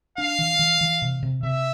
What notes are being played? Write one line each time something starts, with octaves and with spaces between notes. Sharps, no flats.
D4 F5
E3
E3
E3
C3
C3
C3 E5